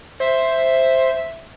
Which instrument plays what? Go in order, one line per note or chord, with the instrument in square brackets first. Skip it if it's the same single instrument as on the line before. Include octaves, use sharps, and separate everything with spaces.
[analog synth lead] C5 [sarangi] E5